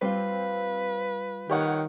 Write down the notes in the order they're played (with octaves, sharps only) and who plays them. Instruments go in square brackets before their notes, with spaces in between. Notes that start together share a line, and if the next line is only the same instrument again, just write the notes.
[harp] G3 F4 [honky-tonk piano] C4 [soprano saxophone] B4
[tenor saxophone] D#3 [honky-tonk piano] G4 C#5 F#5